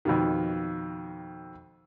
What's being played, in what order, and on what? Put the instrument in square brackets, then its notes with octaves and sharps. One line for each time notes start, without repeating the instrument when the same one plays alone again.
[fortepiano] F2 B2 D#3